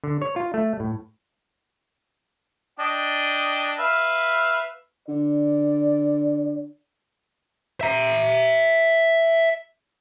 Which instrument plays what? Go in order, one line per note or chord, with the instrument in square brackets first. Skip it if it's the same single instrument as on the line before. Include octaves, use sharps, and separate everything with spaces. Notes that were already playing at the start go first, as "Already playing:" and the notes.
[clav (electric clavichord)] D3
C#5
F4
A3
A2
[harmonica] D4 D#5 G5
B4 E5 F5
[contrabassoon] D3 [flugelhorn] D5
[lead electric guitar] E5 A#5